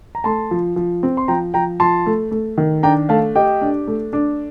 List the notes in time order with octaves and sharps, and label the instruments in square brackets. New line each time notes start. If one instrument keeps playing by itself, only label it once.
[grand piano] A#5
[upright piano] A3 [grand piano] A5 C6
[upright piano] F3
F3
C4
[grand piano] C6
[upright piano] F3 [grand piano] G5 A#5
[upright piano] F3 [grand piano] G5 A#5
[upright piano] F3 [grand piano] A5 C6
[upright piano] A3
A3
D#3
[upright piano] D4 [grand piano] G5 A#5
[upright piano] A3 [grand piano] F5 A5
[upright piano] G4 [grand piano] D#5 G5
[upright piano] D4
A3
D4